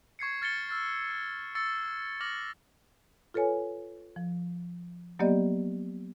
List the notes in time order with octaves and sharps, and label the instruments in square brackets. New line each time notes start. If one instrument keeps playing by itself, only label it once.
[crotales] C#6 G#6 C7 C#7
F6 A6 C#7 G7
E6 F6 A6
C#7
C#6 E6 A6 C#7
D6 F6 A6 A#6 F#7
[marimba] F4 A4 B4 C#5 G#5
F3
F#3 A#3 B3 G4 D5 D#5